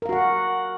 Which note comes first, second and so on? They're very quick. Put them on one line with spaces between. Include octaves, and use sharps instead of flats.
A#4 F5 F#4 F#5